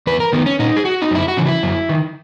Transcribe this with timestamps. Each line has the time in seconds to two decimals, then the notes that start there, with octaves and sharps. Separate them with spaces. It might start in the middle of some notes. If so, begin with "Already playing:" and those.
0.07 E2 B4
0.20 A#4
0.33 D#3 B3
0.46 C#4
0.59 A#2 D#4
0.76 G#4
0.85 F#4
1.02 D#4
1.11 F#2 E4
1.28 F#4
1.37 C#3 E3
1.46 E4
1.63 F#2
1.89 D#3